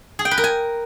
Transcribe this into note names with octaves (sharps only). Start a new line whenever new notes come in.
G#4
G5
B4
A#4
G#5